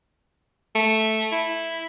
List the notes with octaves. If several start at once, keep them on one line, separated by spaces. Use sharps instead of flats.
A3
E4